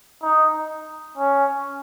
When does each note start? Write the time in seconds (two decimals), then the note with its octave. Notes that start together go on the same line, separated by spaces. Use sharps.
0.22 D#4
1.17 C#4